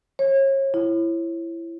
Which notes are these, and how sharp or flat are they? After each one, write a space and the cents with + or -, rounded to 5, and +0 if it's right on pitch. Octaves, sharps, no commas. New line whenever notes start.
C#5 -35
E4 +20